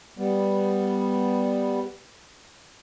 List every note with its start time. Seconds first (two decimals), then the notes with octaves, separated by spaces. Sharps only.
0.18 G3 B3